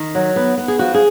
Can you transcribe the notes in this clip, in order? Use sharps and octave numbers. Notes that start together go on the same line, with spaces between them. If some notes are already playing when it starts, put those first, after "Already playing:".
Already playing: D#3
F#3
B3
B3
G#4
F3 F#4
G#4